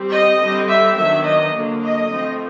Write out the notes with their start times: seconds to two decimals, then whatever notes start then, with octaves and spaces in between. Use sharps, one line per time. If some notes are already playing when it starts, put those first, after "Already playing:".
Already playing: G3 C4
0.11 D#5
0.40 D3 G3 C4
0.68 E5
0.97 D#3 F#3 B3 D4 E5
1.25 D#5
1.54 D3 F#3 A#3 D4
1.82 D#5
2.11 F3 A3 C4